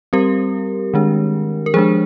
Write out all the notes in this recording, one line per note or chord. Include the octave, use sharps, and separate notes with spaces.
G3 C4 G4 A#4
D#3 G#3 D4
A#4
F3 G#3 D4 G#4 C5